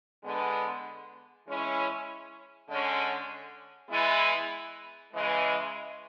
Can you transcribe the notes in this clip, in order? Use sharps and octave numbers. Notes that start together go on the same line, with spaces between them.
D3 G#3 B3
E3 G#3 C#4 E4
D3 G#3 C#4
E3 G#3 B3 E4
C#3 E3 G#3